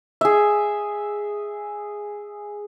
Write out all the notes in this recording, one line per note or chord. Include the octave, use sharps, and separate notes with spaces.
G#4 E5